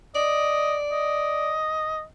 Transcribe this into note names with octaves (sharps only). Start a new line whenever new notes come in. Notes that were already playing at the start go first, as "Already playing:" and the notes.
D5 D#5
D#5